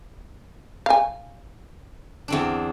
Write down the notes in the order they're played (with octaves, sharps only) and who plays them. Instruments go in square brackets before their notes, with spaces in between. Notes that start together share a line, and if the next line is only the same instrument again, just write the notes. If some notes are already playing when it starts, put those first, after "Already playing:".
[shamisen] F5 G#5
[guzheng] E2 C4 D4